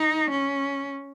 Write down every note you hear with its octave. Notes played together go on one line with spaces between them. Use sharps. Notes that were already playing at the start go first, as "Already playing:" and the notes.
Already playing: D#4
C#4